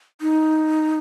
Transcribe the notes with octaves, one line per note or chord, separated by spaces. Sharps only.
D#4